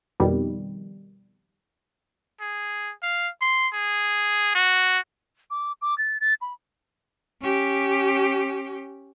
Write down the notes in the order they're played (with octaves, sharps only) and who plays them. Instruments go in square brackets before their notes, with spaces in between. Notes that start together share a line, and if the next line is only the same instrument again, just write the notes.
[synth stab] F2 B2 D#3 G3
[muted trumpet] G#4
F5
C6
G#4
F#4
[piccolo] D6
D6
A6
A6
B5
[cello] C#4 G4